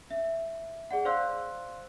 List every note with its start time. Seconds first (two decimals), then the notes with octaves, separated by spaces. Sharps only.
0.11 E5
0.91 G#4 D5 F#5
1.05 C5 D5 F5 C6 E6 F#6